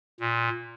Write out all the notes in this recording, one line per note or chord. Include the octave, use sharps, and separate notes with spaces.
A#2